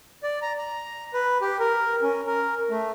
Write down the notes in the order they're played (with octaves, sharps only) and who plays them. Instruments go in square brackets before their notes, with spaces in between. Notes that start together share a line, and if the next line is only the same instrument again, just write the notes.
[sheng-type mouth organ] D5
A#5
A#5
B4
G4
A#4
C#4
A#4
A3